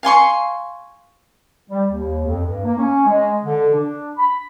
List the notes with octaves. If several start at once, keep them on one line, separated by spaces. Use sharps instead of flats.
F5 G#5 C6 C#6
G3
D#2
F2
G2
A#3
C#4
G#3
D3
D4
B5